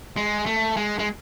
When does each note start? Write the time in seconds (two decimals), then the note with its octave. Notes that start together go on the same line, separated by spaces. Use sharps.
0.17 G#3
0.46 A3
0.77 G#3
0.99 G#3